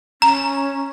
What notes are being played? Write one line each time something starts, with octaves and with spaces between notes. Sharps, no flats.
C#4 A#5